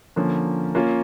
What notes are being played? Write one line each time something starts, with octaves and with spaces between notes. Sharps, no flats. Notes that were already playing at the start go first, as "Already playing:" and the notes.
D3 F3 A#3 C#4
A#3 C#4 F4